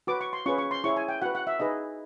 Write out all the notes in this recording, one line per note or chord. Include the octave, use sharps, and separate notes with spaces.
F#4 B4 D6
C#6
C6
C#4 F4 G#4 B4 C#6
C#6
C6
E4 G#4 C#5 C#6
G#5
G5
F#4 B4 F#5
F#5
E5
D#4 G#4 B4 D#5